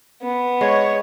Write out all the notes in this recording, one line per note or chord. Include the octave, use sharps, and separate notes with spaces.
B3
G#3 C#5